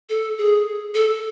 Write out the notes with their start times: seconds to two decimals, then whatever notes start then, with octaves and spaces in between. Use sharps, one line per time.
0.09 A4
0.38 G#4
0.95 A4